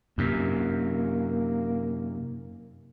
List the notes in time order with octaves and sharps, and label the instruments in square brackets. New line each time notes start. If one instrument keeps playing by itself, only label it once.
[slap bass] F#2 C3 [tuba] A#3